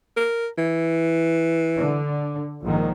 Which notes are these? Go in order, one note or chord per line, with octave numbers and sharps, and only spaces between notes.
A#4
E3
D3
A#1 G#2 D#3